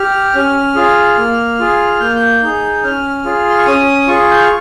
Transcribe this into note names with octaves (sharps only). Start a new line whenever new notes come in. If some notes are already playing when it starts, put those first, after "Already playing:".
Already playing: G4 F6
C#4
F4 G#4
A#3
F4 G#4
A#3 G6
G6
D#4 G#4
C#4 F6
F4 G#4
C6
C#6
C#4 D#6
F4 G#4 C#6
G6
F6